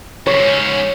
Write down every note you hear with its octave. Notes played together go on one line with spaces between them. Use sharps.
F#2 C3 C#5
G#2 C#4